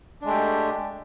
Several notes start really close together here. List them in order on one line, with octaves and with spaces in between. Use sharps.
D4 G#3 A3 G4